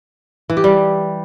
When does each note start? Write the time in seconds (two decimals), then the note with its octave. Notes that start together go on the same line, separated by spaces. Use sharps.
0.50 E3
0.57 G4
0.64 G3